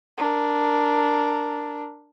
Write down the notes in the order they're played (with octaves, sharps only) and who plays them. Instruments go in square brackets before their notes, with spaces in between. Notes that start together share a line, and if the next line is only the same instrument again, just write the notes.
[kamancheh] D4 A#4